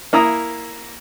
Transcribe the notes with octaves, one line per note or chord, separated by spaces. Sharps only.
A#3 E4 A#5 D#6